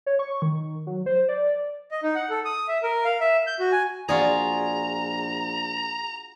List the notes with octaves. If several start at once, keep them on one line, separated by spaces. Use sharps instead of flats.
C#5
C#6
D#3
F#3
C5
D5
D#5
D#4
F#5
A4
D#6
E5
A#4
F5
E5
G6
F#4
G#5
A#1 F4 F#4 G#4 D5 A#5